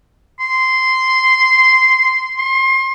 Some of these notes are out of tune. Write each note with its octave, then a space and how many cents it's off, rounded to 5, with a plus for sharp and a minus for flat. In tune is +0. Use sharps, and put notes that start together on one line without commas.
C6 -10
C6 +30